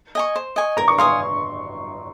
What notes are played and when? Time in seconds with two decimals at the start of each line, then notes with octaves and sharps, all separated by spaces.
0.15 D#5 G#5 C#6
0.36 C5
0.56 D#5 G#5 C#6
0.77 A#4 A#5
0.88 C#6
0.98 F5 G#5 C6 D#6